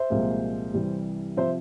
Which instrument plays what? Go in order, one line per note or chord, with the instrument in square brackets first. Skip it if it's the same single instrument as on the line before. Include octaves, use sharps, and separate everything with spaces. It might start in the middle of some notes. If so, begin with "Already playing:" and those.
Already playing: [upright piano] C5 E5
C2 A#2 F3 G#3
C2 C3 E3 G3
C3 F3 C5 E5